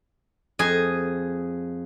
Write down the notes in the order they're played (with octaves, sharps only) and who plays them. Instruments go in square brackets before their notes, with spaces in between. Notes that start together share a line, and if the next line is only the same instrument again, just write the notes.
[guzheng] F2 G#4 D#5